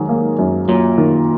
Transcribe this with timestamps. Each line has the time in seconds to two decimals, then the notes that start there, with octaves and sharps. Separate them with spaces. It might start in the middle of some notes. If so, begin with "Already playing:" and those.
Already playing: G#2 D#3 F#3
0.09 A#3
0.39 F#2
0.68 A#2 F#3
0.98 D#3